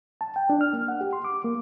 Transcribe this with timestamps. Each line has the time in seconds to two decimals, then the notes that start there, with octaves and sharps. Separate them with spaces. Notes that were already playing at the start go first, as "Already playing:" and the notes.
0.21 A5
0.36 G5
0.50 D4
0.61 F6
0.73 A#3
0.88 F#5
1.01 G4
1.13 C6
1.25 D6
1.44 A#3